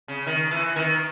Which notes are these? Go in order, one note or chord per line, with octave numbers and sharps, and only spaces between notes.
C#3
D#3
E3
D#3